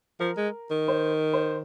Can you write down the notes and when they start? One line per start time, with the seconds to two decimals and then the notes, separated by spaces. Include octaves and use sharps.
0.20 F3 A#4
0.37 G#3
0.71 D#3
0.88 C5
1.34 C5